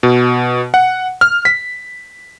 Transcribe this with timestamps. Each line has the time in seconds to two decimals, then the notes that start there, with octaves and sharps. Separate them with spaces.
0.03 B2
0.74 F#5
1.21 F6
1.45 B6